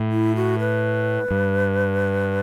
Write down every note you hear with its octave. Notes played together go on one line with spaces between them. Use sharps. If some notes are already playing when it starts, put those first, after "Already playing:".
Already playing: A2
E4
F#4
B4
G2